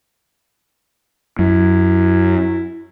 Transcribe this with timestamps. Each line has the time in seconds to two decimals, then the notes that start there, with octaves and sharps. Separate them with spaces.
1.39 F#2 E4